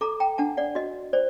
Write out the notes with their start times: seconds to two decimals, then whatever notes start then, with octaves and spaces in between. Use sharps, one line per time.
0.01 A4 A#5 D6
0.20 G5 A#5
0.38 D4 F#5 A5
0.57 D5 F#5
0.75 F#4 D#5
1.13 C5 D5